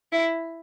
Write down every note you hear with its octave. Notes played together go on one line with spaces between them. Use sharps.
E4